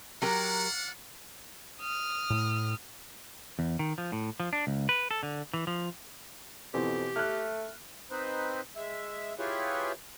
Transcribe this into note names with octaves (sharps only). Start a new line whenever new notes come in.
F#3 G4 A#4 D5 F5 F#5
D#6 F6
A2 A3
E2
D#3
F3
A2
F3
D4
C#2
B4
A4
D3
E3
F3
F2 B2 E3 C4 G4
A3 F6 F#6
C4 D#4 B4 C5
G#3 E5
E4 F4 G4 G#4 B4 C#5